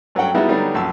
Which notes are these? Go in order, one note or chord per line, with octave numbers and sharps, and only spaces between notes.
G2 F#3 A3 C#4 F#5 G5
G3 G#3 B3 D#4 E4 F#4
D3 F#3 G3 B3 D4 D#4
A#1 F#2 A5 E6